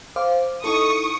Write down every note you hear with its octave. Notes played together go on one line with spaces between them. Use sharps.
C5 F5 D6
D#4 E4 A4 C#6 D#6